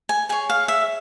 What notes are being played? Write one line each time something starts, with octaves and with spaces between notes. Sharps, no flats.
G#5
G#4 C#5 G#5
F5
E5